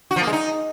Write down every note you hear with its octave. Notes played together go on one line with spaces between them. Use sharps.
F#4
F3
A#3
G#3
D#4